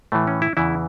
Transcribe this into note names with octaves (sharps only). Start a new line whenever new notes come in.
A2 E3 A3
C#4
E4
E2 C#3 E3 E4